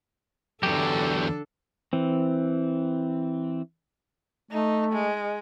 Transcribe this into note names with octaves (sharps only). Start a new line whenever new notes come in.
E2 D3 F#3 D4 G4 A4
E3 C4
A3 D#4
G#3